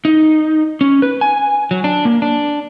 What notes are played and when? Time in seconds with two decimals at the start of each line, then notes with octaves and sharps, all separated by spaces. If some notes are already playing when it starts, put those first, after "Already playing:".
0.05 D#4
0.81 C#4
1.02 B4
1.21 G#5
1.71 F#3
1.84 D4
2.05 A#3
2.22 D4